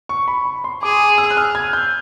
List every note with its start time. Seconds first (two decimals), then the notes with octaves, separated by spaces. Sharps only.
0.09 C#6
0.28 B5
0.46 B5
0.64 C6
0.82 G#4 D6
1.00 D#6
1.18 E6
1.30 F#6
1.37 F6
1.55 G#6
1.73 G6